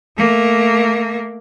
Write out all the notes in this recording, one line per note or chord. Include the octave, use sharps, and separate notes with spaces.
A3 A#3